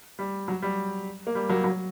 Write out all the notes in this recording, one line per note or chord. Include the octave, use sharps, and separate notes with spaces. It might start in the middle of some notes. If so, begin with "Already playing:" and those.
G3
F#3
G3
A#3
G3
F#3 A#3
F#3